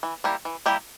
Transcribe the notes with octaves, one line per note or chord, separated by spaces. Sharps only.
E3
G3 A#3 E4 G4
E3
G3 A#3 E4 G4